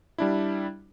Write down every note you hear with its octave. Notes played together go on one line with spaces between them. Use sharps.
G3 D4 E4